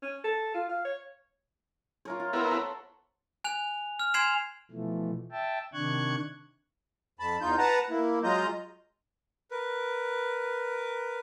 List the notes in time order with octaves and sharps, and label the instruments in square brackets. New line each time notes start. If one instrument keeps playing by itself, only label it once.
[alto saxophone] C#4
A4
F4
F5
C#5
[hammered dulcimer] F4 A#4 C#5
F4
[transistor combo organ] B3 E4 A#4 [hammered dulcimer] F#5 C6
[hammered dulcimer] A4 C5 C#5
[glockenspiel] G#5 F#6 F7
F6
G#5 C6 G#6 C7 E7 F7
[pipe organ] B2 E3 F3 A3
E5 G5 A5
C3 D#3 D4 C#6 F#6 G#6
[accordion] F2 A5 B5
E2 D#4 F4 G6
B4 F#5 A5 A#5
A#3 E4
F#3 G#3 F4 D#5 A#5 G6
[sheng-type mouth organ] A#4 B4